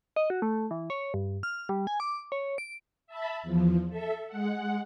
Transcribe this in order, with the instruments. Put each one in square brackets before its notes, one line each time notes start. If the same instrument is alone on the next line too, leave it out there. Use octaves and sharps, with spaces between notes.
[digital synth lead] D#5
F#4
A3
E3
C#5
G2
F6
G3
G#5
D6
C#5
D7
[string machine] E5 A5 B5
E2 F3
A4 E5
G#3 F#5